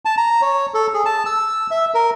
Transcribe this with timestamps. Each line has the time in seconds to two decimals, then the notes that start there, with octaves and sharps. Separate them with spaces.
0.05 A5
0.17 A#5
0.42 C#5
0.74 A4
0.94 G#4
1.05 A5
1.26 E6
1.71 E5
1.94 A#4